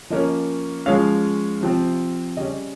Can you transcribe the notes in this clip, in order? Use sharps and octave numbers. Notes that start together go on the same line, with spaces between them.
F3 A#3 C#4 D#5
F3 G#3 C#4 F5
C3 F3 C4
C#3 G3 C#4 D#5